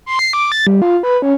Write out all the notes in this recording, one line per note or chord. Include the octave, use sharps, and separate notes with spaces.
C6
C7
D6
A6
G3
F4
B4
C#4